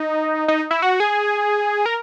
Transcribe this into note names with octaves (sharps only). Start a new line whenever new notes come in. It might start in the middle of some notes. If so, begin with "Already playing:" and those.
Already playing: D#4
D#4
E4
F#4
G#4
A#4